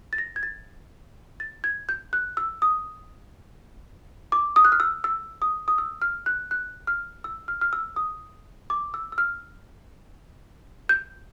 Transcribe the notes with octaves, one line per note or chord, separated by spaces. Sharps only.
A6
A#6
G#6
A6
A6
G#6
G6
F#6
E6
D#6
D6
D#6
F#6
F6
E6
E6
D#6
D#6
E6
F6
F#6
F#6
F6
E6
F6
F6
E6
D#6
D6
E6
E6
F6
G6